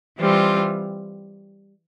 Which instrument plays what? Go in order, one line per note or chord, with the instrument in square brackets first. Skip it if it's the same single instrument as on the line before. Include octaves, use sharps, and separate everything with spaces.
[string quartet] E3 G3 C4 F4